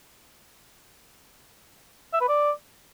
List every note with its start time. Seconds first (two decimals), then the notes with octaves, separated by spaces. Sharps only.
2.13 E5
2.21 B4
2.29 D5